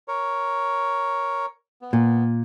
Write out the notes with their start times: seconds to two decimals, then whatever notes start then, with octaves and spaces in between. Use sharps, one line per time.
0.08 A#4 C#5
1.82 B3
1.93 A#2